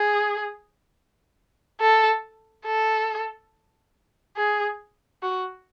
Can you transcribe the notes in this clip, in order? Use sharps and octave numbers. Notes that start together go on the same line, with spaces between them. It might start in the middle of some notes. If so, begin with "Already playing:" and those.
Already playing: G#4
A4
A4
G#4
F#4